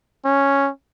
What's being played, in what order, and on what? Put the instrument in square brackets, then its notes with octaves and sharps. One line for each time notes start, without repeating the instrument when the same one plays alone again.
[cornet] C#4